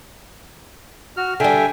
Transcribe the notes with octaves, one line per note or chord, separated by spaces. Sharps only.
F#4 F6
D3 G3 E5 G5 G#5